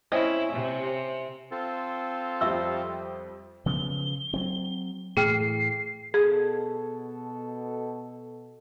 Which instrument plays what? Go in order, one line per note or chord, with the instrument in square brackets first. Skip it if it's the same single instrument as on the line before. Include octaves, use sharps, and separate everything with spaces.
[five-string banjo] C4 C#4 D#5 [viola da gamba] E4
[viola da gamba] C3
[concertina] C4 F4 A4
[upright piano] F2 F3 G3 [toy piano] E5 C#6 E6
[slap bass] C#3 F3 B3 [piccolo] G7
[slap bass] F#3 C4
[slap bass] A2 E3 A3 [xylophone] G#4 G5 F6 [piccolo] C7
[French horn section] B2 A4 [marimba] G#4